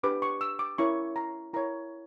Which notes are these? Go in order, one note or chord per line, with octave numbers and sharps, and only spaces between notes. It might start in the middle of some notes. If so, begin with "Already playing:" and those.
D4 G4 B4 D6
C#6
E6
D6
C#4 E4 A#4 C#5 C#6
A#5
E4 A#4 C#5 A#5